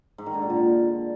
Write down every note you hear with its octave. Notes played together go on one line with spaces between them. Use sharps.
G#2
D#3
D3
A#2
D3